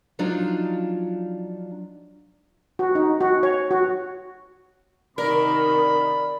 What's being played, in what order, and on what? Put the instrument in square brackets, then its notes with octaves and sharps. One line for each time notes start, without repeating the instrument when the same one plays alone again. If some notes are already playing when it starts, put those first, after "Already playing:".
[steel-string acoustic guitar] F3 F#3 D4 D#4 F4
[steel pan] F#4
D#4
F#4
C#5
F#4
[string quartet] C3 D#3 [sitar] A#4 [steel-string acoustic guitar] D5 [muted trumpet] B5